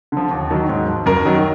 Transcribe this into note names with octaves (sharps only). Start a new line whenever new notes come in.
D3 F3
D#2
D#3 F#3
G#2
F3
F#2 A#4
D#3 F#3